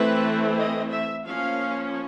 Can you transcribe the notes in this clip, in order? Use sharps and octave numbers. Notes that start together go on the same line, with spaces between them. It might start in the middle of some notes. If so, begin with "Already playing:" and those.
Already playing: E3 A3 C4 B4
D#5
E5
F3 A#3 C#4 F5